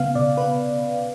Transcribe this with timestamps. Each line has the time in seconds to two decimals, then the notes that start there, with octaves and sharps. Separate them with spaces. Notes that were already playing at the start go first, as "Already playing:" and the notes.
Already playing: C#3 B3 F5
0.15 B2 D5
0.37 B3 B4